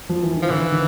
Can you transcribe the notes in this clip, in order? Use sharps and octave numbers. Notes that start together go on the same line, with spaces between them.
F3
E3
D#3
F3
D3 E3
D#3